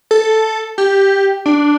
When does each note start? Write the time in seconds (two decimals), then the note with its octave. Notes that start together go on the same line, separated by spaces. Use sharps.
0.11 A4
0.78 G4
1.46 D4